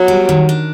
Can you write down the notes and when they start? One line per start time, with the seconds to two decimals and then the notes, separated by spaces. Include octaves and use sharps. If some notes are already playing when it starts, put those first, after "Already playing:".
Already playing: F#3 B3
0.08 G3
0.29 D#3
0.49 D4